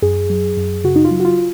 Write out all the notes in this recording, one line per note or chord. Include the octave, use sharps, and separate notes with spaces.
F#2 G#4
F#3
F#2
C#3 F#4
D#4
F4
F#3
F#4
F4